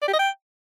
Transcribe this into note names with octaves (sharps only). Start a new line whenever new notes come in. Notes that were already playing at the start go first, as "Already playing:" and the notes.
D5
G4
D#5
G5